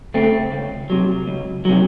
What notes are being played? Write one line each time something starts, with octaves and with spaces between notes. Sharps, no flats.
C#3 A3 C4
C#2
C3 F#3
C#2
C3 F#3